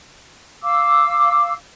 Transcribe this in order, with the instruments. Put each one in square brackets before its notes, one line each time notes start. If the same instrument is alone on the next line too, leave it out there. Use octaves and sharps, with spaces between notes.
[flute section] F5 D6 E6